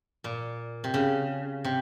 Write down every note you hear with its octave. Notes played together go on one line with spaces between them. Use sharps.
A#2
C3
C#3
C3